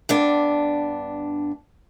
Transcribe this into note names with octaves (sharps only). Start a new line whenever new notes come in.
G2 B3 D4